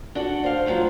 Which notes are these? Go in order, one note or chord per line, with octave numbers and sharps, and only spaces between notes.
D4 F#4 A4
C5 F5
D2 G2 F3 F#3 C5